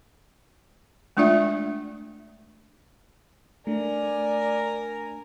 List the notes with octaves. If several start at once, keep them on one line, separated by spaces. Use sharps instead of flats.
G#3 A3 D4 F4 D5 E5
A3 D4 A#4 D5 G#5